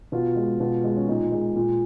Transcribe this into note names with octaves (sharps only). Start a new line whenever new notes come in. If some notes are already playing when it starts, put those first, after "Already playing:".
B2 F4
G#3
B2 F4
G#3
C#4
A#2 D#4
G#3
A#2